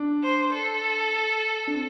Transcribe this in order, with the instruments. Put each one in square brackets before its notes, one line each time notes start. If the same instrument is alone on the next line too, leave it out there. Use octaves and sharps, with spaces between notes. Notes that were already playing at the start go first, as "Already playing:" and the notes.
Already playing: [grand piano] D4
[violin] C5
A4
[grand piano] D4
C4